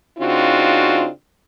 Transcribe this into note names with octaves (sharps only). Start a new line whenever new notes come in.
C#3 C4 D4 D#4 F4 F#4